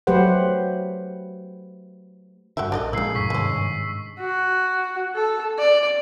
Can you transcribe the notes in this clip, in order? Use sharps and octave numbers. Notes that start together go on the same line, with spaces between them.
F#3 A3 G4 B4 C5 F#5
G2 D3 F#4 G4 E5
A#1 D4 A4 A#4 D5 D#5 A#5
A#2 C#3 F3 G#3 E4 E6 C7
E2 G#2 B2 C#6 B6
G2 C3 D#3 G#3 C#4
F#4
A4
D5